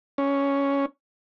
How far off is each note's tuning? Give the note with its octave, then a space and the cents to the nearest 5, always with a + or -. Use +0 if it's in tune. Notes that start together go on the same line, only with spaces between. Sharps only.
C#4 +5